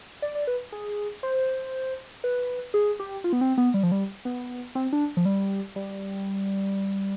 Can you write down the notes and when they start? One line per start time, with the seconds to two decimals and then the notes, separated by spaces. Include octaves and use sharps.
0.22 D5
0.35 D5
0.47 B4
0.72 G#4
1.23 C5
2.24 B4
2.74 G#4
3.00 G4
3.24 F4
3.33 B3
3.41 C4
3.58 B3
3.74 G3
3.83 F3
3.92 G3
4.25 B3
4.75 C4
4.93 D4
5.17 F3
5.26 G3
5.76 G3